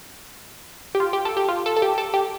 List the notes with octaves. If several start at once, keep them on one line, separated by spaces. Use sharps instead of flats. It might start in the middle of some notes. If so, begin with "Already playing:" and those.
G4
F4
G4
A4
G4
F4
A4
A4
G4
A4
G4